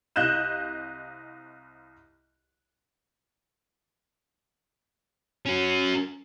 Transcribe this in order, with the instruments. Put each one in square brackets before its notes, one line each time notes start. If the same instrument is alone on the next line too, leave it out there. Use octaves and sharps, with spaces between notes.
[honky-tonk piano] C2 D#5 F5 F#6 G6 E7
[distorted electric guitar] C#4 F#4